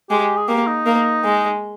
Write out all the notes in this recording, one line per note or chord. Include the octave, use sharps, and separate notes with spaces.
G#3 G4
G#4
A#3 G4
D#4
A#3
G#3